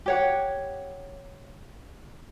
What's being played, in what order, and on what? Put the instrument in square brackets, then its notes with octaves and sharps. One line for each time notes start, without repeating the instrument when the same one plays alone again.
[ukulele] G4 C#5 F#5